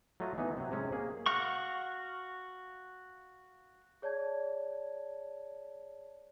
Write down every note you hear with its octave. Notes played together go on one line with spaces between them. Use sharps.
F#3 A3 F4 D#5
E3 B3 D#4
C3 F#3
C3 G#3 C#4
A#3 G#4
F#4 F5 F#5 C#6
G#4 C#5 D5 A5 G#6